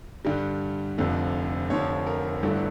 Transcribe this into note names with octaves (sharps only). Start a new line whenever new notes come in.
G2 D3 G3
F1 F2 D3
F1 F2 D3 F3 C#5
A#4
G1 G2 D3 A3 E4